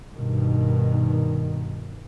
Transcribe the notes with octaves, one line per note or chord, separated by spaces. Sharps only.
G2 B2 D#3